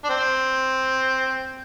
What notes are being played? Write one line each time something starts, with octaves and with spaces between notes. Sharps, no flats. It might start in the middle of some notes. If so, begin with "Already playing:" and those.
D4
C4